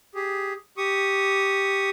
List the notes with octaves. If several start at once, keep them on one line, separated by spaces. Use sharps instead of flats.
G4 G#4
G4 C#6 D#6